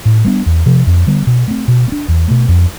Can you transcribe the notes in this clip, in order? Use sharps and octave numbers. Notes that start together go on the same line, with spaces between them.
A2
G3 B3 D4
E2
C3 F3
F2
D3 G3 B3
B2
A3 C4
B2
B3
D4
E2
B2 A3
F2